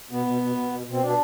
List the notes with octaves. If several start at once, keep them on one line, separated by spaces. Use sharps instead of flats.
B2 B3
B2
B2
B2
B2
B2 C4
B2 D4